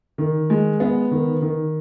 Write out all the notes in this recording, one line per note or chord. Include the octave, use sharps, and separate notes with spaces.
D#3
G#3
B3
D#3
D#3